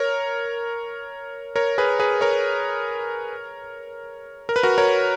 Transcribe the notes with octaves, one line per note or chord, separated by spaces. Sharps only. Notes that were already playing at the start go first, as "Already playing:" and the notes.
Already playing: A#4 C#5
A#4 C#5
G#4 B4
G#4 B4
A#4 C#5
A#4
B4
F#4 A#4
A#4 C#5